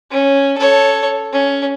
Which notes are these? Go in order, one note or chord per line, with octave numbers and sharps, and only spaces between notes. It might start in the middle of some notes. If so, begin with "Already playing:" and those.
C#4
A4 C#5
C#4